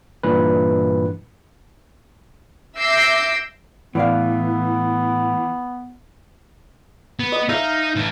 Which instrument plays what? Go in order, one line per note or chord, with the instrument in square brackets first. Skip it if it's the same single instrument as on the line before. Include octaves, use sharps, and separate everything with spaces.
[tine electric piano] G2 A#2 E3 B4
[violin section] E5 D6 E6 G6 A#6 C7
[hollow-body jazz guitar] A2 D5 F5 [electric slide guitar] E3 [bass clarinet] B3
[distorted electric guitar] B3
[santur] D#5
[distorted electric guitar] D#4 [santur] E5 F5
[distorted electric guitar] A2 E3